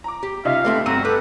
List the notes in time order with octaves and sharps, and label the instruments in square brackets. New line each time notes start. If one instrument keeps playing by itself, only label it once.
[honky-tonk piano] A#5 D6
[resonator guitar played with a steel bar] G4
[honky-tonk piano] C#3 D#4 F4 [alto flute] E5 [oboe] F5
[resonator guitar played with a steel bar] D3 C4 E5 [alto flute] A3 [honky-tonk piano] B3 A4
[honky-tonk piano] G1 E6 D#7 [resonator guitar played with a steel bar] C4 [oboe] F#4 [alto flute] A#5
[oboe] G4 [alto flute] A4 [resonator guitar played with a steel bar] B4